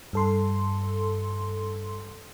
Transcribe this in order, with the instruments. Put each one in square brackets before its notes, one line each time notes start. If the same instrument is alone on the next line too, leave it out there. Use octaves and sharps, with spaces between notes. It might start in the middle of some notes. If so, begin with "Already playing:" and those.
[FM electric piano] G2 A4 C6